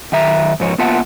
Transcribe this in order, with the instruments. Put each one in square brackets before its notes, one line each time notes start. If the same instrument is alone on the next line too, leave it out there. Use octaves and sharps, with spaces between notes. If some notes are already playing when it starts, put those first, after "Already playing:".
[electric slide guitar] F#2 D#3 E5 A#5
G#2 F3 C#5
A#3 B3 F4 E5 F#5 A5